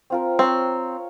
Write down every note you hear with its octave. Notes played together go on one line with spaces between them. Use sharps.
C4 F4 A#4
C4 C#5 A#5